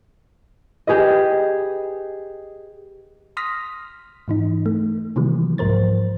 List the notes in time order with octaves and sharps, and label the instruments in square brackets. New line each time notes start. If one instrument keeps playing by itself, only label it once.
[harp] G4 G#4 B4 D#5
[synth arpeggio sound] C6 D#6 F6 A#6 B6
G#2 E3 D#4
A3
C3 D#3 E3 F#3 G3 A#3
C2 G#2 F3 A#4 C5 A6